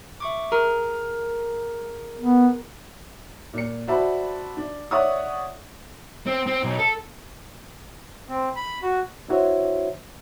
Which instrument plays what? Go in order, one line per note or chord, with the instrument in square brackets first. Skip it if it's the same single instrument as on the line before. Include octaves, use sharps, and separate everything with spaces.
[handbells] E5 C#6 D6
G#4 A#4 A#5
[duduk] B3
[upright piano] A#2 C#7
F#4 C5 D5 E5 A5 B5
D4
C#5 D5 E5 F#5 C#6 D#6
[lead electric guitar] C4
C4
B1
A4
[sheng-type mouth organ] C4
B5
F#4
[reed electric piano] D4 E4 F#4 C5 C#5 E5